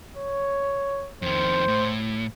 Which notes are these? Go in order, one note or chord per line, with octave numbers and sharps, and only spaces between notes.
C#5
F2 D#3 C5
A2